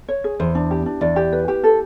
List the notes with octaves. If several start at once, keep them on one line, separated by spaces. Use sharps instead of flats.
C#5
G#4
E2 C5
D4
G4
D4
E2 D5
G4
B4
G4
A4